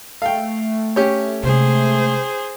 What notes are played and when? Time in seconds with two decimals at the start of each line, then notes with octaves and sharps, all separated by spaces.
0.22 A3 F5 G5
0.96 C#4 G4 C#5
1.43 C3 G#3 G#4 C5